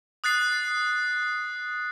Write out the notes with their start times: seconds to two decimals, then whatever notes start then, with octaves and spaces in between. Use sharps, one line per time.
0.24 D#6 F#6 A6 C7